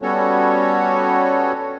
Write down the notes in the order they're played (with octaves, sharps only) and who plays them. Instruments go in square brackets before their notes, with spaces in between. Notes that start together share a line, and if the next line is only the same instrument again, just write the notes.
[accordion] G3 B3 C#4 F#4 A4 C#5